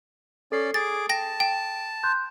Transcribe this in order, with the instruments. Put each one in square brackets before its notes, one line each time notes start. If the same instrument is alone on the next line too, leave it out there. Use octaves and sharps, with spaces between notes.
[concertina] C#4 D5 [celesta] A4 C7
[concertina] G#4 D6 [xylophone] A6
[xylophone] G5 A#6 [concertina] A5
[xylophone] G5 [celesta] E7
[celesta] C6 F#6 G6